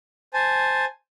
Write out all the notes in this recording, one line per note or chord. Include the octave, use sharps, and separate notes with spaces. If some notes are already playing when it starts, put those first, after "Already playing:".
C5 G#5 A5